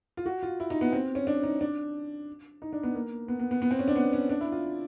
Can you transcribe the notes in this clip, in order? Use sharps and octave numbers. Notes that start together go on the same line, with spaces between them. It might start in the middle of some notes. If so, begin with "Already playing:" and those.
F4
F#4
F4
E4
D#4
B3
C4
C#4
D4
D#4
D4
D#4
D4
B3
A#3
B3
B3
B3
B3
C4
C#4
D4
B3
C#4
D4
E4
F4